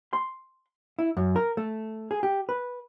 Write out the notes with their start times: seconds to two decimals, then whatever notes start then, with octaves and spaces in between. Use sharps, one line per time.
0.13 C6
0.99 E4
1.17 F#2
1.36 A#4
1.57 A3
2.11 G#4
2.23 G4
2.49 B4